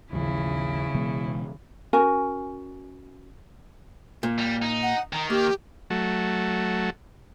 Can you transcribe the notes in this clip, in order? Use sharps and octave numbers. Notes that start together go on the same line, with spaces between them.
A1 D#2 C#3 F3 E4
B2 E3 G#3
C#4 F#4 A#4 G#5
A#2
G3
D#4
F#5
D#3 A#5
A#3 G4
F#3 A3